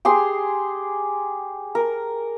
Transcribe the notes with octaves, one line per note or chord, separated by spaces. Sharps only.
G4 G#4 C6
A#4